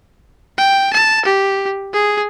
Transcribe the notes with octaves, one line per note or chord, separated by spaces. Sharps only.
G5
A5
G4
G#4